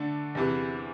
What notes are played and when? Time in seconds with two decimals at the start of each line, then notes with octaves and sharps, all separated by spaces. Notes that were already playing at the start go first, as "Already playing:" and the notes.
Already playing: D3 A3 D4 A4
0.35 E2 C3 E3